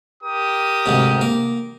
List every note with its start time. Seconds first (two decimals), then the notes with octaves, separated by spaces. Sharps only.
0.23 G4 A#4 D#6
0.86 D2 G#2 C3
1.21 A#3